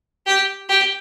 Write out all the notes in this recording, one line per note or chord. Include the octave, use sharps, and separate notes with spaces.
G4
G4